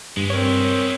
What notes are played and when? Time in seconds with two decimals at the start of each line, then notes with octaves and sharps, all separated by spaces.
0.17 G2 G#3 B3
0.30 C4 A#4 C#5